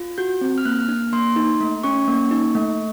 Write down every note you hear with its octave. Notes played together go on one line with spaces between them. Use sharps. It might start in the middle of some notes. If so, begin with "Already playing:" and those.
Already playing: F4
F#4 G6
C4
F6
A#3 F#6
F6
D4
A#3 C6
D#4
A3
C#4 C#6
A#3
D#4
A3